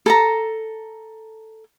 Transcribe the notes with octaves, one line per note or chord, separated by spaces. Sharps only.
A4 A5 A#5